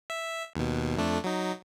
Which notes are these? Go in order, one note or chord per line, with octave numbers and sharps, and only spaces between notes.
E5
D#2 B2
F2 A3 D4
F#3 D#4